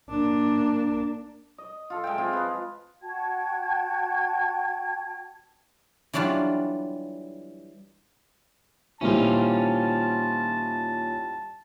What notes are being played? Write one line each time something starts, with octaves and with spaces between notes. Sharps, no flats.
A#3 D4
D#5
F4 A4
G#3 E5 G5
C4 F4 G#4 D#5
F3 B4
F#4 G5 A5 G#6
E3 F#3 G3 D4 F4
A#2 D#3 F3 G3 C#4 E4 F4 A5